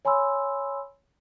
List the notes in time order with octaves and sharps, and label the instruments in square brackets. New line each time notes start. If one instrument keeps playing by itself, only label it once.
[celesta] C#5 G#5 B5 C6 E6